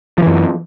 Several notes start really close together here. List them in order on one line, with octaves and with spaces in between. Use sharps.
F3 E3 F#2